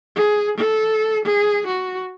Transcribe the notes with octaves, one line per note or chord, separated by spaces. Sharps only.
G#4
A4
G#4
F#4